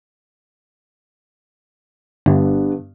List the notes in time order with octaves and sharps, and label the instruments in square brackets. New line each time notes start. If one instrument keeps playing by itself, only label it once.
[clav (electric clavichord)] G1 [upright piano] G2 B3 D4